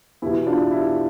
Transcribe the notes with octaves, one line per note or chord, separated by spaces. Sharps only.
E2 B2 E4 G4
D4 F4
E4 G4